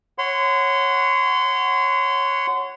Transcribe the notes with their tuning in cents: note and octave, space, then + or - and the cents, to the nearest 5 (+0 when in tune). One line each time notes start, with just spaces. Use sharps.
C#5 -10 F#5 +0 C6 -30